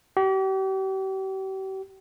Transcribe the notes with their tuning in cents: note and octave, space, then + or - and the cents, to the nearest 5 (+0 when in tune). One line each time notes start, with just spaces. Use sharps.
G4 -40